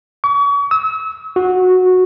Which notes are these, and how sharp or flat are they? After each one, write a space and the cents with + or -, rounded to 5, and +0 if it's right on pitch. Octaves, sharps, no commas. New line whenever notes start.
C#6 +40
E6 -35
F#4 -10